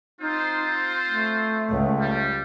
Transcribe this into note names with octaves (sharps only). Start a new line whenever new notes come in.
C4 D#4 F4 C5
A3
C#2
G3